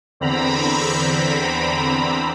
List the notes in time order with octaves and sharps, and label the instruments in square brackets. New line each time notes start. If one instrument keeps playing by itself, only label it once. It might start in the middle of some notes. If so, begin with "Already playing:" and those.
[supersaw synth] E2 D3 C4 A#5 B5